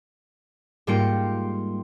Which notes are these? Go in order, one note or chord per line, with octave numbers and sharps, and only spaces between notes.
G#2 G3 A#3 F4 G5 C#7